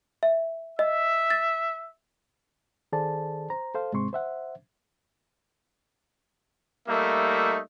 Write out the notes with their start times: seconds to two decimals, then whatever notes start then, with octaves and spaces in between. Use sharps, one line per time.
0.23 E5
0.79 D#5 E5
1.30 A6
2.93 D#3 G#4 A4 C5 D5 A5
3.50 C5 A#5
3.75 A4 C5 F5
3.93 G#2 C3 G#3 C4 C6 C#6
4.13 C5 E5 F#5
6.88 G3 A3 A#3 D#4 E5